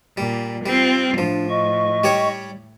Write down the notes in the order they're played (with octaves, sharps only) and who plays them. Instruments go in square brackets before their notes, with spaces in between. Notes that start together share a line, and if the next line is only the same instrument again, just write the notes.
[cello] A#2 [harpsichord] G3
[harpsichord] G3 [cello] C4 F4
[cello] A2 [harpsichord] F3 [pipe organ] D4
[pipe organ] D#5 C#6
[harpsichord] G3 G4 C#5